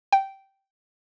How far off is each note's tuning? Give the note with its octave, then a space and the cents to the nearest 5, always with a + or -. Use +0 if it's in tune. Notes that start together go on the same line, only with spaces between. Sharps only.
G5 -10